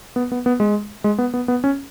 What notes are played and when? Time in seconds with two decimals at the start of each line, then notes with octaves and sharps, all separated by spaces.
0.16 B3
0.32 B3
0.46 B3
0.60 G#3
1.04 G#3
1.18 B3
1.34 B3
1.48 B3
1.64 C#4